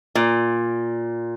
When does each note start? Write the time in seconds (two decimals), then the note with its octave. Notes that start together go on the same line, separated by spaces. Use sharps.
0.15 A#2